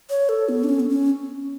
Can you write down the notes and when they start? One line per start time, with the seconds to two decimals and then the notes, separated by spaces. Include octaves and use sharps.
0.10 C#5
0.29 A4
0.49 B3
0.64 D4
0.69 C#4
0.80 B3
0.89 C#4